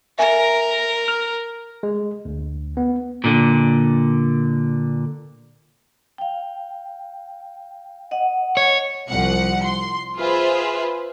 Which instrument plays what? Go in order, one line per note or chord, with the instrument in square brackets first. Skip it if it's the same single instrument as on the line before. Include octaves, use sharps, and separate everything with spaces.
[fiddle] A#4 [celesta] E5 G#5
[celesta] F6 F7
[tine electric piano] G#3
D2
B3
[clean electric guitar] A#2 D3
[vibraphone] F5 G5
D#5 F#5
[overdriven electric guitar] C#5
[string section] C2 F3 F#5 C#7
C6
F4 G#4 B4 C5 E5